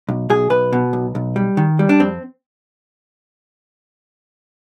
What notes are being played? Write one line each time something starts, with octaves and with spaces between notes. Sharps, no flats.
B1
B1 G#4
B1 B4
B2
B1
B1
G3
D#3
G3
D4
F2 C4